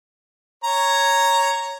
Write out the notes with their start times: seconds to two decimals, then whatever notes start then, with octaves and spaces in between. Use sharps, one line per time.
0.64 C#5 A#5